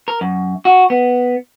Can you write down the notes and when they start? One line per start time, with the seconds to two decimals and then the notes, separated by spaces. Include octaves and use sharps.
0.08 A#4
0.21 F#2
0.65 F#4
0.90 B3